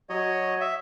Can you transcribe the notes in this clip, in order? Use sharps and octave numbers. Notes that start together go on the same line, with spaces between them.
F#3 C#5 D#5
E5